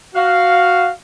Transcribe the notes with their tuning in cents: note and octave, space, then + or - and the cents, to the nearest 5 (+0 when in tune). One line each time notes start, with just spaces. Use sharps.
F#4 +0 F5 +0